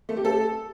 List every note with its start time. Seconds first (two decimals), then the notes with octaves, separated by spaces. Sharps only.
0.09 A3
0.17 G4
0.25 A4